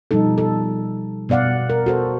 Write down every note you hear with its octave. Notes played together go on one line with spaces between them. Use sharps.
B2 F3 G3 D#4 A4
A4
B2 B3 D5 F5 F#5
A#4
F#4 A4 C5